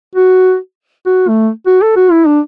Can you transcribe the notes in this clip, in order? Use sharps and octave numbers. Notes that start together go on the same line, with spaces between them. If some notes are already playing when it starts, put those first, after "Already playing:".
F#4
F#4
A3
F#4
A4
F#4
E4
D4